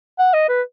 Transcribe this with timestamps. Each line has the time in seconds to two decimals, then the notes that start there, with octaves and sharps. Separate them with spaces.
0.19 F#5
0.34 D#5
0.49 B4